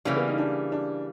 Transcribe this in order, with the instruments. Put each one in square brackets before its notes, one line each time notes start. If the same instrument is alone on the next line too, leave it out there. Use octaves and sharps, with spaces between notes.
[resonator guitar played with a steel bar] C#3 E3 G3 A#3 [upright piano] C#4
[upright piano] B3
D#4
D4
D4